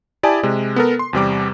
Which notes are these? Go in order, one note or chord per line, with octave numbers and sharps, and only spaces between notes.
E4 G4 D5 G#5 A5 D#6
C3 G#3
B3 A4 A#4
C6
E2 C3 G3 D6